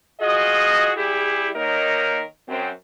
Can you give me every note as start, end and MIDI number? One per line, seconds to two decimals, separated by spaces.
0.21 0.91 65
0.21 0.91 66
0.21 0.91 68
0.21 0.91 75
0.97 1.49 55
0.97 1.49 64
0.97 1.49 67
0.97 1.49 68
1.56 2.22 51
1.56 2.22 58
1.56 2.22 63
1.56 2.22 70
1.56 2.22 73
1.56 2.22 75
2.48 2.70 42
2.48 2.70 60